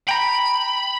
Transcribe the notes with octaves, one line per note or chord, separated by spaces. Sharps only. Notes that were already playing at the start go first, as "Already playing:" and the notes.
G5 A#5 B5